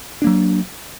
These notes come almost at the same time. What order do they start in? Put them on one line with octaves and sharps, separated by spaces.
D4 A#3 F#3